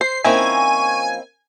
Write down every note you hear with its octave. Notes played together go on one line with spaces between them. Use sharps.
C5 C7
F3 A#3 C4 C#4 D#4 E4 G#5 C#6